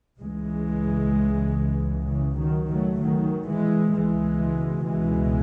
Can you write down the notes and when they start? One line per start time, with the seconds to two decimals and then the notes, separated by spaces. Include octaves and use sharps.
0.20 C#2 C#3 E3 G#3
2.08 C#3 E3
2.40 D#3 F#3
2.70 F#3 A3
3.02 D#3 F#3
3.49 E3 G#3
3.96 C#2 B2 E3 G#3
4.90 E3 G#3